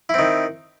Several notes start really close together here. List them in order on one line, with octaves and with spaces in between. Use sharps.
E4 C4 D#3